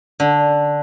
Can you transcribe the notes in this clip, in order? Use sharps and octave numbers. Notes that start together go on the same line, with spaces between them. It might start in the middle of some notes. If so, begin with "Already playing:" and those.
D3